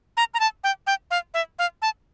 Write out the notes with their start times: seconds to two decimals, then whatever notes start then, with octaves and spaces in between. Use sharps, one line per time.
0.17 A#5
0.34 A#5
0.40 A5
0.64 G5
0.87 G5
1.11 F5
1.34 E5
1.59 F5
1.82 A5